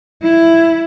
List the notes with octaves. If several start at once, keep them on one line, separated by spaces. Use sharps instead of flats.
E4